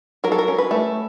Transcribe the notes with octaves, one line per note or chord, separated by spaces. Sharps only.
F#3 A#4
A4
A#4
C#4
B4
A3